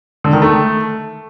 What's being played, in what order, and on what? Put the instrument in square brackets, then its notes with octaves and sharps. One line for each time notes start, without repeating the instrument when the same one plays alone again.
[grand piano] D3
D#3
A3